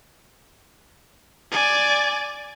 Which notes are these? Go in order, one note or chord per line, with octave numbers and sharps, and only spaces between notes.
D5 G#5